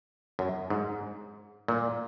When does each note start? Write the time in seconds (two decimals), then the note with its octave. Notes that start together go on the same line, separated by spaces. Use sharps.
0.39 F#2
0.70 G#2
1.68 A#2